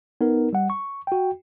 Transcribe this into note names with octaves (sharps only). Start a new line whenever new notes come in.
B3 D#4 A#4
G3 F#5
C#6
F#4 G5